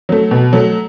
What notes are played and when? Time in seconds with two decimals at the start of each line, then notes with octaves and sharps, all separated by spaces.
0.09 F#3 A3
0.31 B2
0.53 F#3 A3